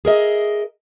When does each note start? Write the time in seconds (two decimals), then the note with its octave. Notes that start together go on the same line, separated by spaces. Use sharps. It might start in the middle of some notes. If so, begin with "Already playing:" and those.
0.05 G#4 A#4 D#5 E5